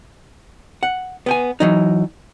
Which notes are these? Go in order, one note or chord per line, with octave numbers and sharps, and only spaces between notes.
F#5
B3 G5 G#5
E3 F#3 D#4